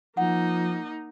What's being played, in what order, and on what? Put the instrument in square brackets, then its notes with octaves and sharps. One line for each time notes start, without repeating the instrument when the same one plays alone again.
[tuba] F3 [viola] A#3 D#4 [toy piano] F#5